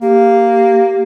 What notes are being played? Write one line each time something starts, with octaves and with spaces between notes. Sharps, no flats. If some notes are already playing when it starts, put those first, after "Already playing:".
A#3 G4